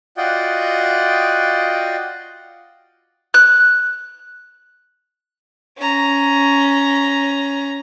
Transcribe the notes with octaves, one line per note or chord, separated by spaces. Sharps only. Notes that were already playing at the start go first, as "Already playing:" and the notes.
F4 F#4 D5 D#5 F#5 G5
F#6
C#4 A#5